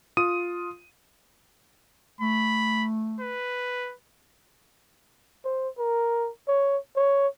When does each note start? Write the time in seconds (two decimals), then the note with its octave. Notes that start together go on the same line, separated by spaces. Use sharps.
0.17 F4 D#6 D#7
2.21 A3 B5
3.20 B4
5.45 C5
5.78 A#4
6.48 C#5
6.96 C#5